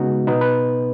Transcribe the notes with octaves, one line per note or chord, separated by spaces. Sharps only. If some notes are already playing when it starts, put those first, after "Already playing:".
Already playing: C#3 G#3 B3 D#4 F#4
B2 B3 D#4 B4
B4